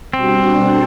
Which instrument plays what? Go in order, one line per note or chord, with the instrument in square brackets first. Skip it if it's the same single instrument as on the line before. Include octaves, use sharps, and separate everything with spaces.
[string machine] B2 G3 D4 F#4 [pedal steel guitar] C4
[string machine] D4 A4 C5